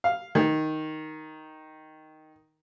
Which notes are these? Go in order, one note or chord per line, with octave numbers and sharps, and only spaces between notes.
F5
D#3